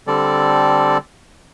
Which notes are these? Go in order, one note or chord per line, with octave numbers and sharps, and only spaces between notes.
D3 G3 C4 A4 D5